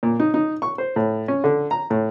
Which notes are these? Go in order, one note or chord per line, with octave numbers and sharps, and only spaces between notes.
A#2
D#4
D#4
C#6
C5
A2
C#4
D3
A#5
A2